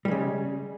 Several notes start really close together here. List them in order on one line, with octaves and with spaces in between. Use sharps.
G3 G#3 C#3